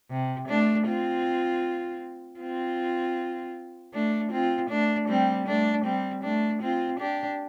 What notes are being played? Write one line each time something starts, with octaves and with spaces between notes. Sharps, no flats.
C3
A3 D4
C4 F4
C4 F4
A3 D4
C4 F4
A3 D4
G3 C4
A3 D4
G3 C4
A3 D4
C4 F4
D4 G4